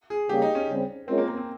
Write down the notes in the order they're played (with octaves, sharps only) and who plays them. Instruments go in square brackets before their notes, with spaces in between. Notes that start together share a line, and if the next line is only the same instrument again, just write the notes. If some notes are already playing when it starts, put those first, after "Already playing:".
[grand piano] G#4
[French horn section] C#3 G3 A#3 [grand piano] G4
[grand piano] D#4
C#4
[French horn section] C#3 G3 C4
[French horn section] G#3 C#4 F4 A#4 [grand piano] C4
[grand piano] A#3
A#3
C4